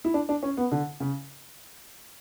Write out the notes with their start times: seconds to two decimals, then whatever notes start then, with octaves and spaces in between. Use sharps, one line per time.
0.04 E4
0.14 D4
0.29 D4
0.43 C#4
0.57 B3
0.71 D3
1.00 C#3